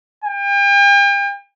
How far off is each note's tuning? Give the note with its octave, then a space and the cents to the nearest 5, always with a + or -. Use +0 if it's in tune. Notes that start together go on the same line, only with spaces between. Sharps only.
G5 +40